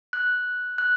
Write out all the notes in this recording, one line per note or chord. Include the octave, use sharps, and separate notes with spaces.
F#6
F#6